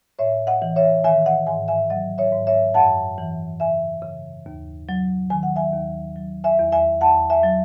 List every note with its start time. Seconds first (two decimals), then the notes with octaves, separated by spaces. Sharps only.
0.19 A2 C#5 E5
0.47 D#5 F#5
0.62 E3
0.76 C#5 E5
1.04 D#3 E5 G#5
1.26 D#5 F#5
1.47 G#2 E5 G#5
1.68 E5 G#5
1.90 F#3 D#5 F#5
2.18 C#5 E5
2.33 G#2
2.47 C#5 E5
2.74 F#2 F#5 A5
3.18 E3
3.60 C#3 E5 G#5
4.02 C#3
4.46 D#2
4.89 F#3
5.30 D#3 G#5
5.43 F#5
5.56 E5 G#5
5.74 D#2
6.16 F#3
6.44 E5 G#5
6.59 E2
6.72 E5 G#5
7.01 E2 F#5 A5
7.30 E5 G#5
7.43 F#3